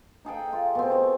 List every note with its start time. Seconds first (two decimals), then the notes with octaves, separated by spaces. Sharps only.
0.25 D#4 G#4 A4 G5
0.53 F4
0.75 B2 C4
0.90 C5 C#5